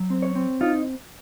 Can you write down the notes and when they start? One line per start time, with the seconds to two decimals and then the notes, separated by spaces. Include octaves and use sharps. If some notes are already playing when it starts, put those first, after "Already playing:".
Already playing: F#3
0.10 C4
0.22 C#5
0.35 C4
0.61 D#4 F4